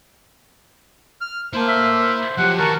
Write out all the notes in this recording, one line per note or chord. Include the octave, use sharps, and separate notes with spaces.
F6
A#3 E4 C5 A5
E5
F3 F#3 G4 F#5
D#3 E3 F#4 A#4 A5 C#6